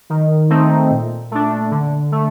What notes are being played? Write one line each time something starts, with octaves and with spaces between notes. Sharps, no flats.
D#3
A3 C4 D#4
A#2
A3 D4
D3
A3